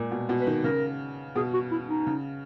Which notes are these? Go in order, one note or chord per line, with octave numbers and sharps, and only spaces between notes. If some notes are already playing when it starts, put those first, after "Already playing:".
Already playing: A#2 G#3
B2
B2
B4
D#3
C#3 A#4
B2 G#4
F#4
E4
D#4
C#3